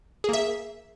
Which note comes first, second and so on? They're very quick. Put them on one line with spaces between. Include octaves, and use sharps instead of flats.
G#4 A#3 E5